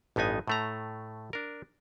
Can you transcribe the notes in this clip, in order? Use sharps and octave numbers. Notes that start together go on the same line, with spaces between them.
A1 G2 B3 D#4 G#5
A2 A3 A#5
D4 A#4